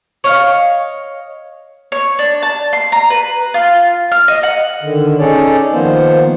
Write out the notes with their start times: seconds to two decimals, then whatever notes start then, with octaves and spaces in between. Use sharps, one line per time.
0.24 C#5 D#5 F5
1.92 C#5
2.19 D4
2.43 A5
2.73 C6
2.92 A#5
3.10 B4
3.54 F4
4.12 F6
4.28 D#5
4.43 F#5
4.82 D3 D#3
5.19 C#4 D#4 G#4 A4 C#5 D5
5.72 D#3 F3 A#3 B3 C5